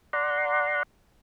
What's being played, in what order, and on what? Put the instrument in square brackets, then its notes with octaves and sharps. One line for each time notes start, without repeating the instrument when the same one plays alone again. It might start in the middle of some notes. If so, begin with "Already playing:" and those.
[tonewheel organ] D5 F#5 A#5 C6